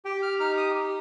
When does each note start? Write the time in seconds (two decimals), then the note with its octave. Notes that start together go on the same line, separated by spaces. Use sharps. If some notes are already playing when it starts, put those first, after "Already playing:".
0.05 G4 G5
0.22 F6
0.40 D#4 F6
0.57 D#6
0.75 G4